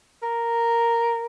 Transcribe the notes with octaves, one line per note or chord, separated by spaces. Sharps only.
A#4